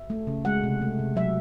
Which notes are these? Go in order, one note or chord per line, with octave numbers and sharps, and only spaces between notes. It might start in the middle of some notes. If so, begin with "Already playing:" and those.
Already playing: E5
A3
C#3
G#3 F#5
C3
A3
C3
F#3 E5